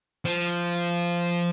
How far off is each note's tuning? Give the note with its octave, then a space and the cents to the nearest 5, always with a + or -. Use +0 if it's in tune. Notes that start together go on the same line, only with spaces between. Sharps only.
F3 -10